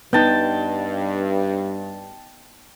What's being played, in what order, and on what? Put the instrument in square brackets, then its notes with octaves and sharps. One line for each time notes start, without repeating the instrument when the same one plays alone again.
[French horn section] G2 [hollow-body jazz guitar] B3 D#4 [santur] G5 A5